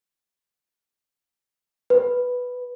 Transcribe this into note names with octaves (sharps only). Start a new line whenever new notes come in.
B4